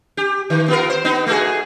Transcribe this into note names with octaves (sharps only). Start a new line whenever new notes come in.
G4
D#3
B3 F4 A#4
C5
B3 D#4
A3 F#4 G#4